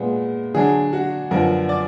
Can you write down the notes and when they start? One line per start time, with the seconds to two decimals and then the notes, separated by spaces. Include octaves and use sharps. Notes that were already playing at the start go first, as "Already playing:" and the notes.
Already playing: A#2 G#3 B3
0.54 D3 F#3 D4 G#4
0.93 F#4
1.31 F#2 D3 F3 B3 A#4
1.69 D5